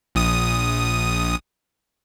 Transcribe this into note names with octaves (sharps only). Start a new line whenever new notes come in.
A#1 D#6